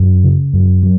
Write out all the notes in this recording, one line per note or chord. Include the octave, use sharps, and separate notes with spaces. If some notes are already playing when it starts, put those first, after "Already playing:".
Already playing: F#2 F#3
C#3
F#2
F#3